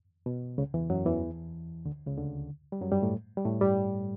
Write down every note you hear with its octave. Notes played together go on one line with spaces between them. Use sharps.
B2
C#2 C#3
E2 E3
F#2 F#3
E2 E3
D2 D3
C#2 C#3
D2 D3
G3
F#2 F#3
G2 G3
A2 A3
G3
A2 A3
G2 G3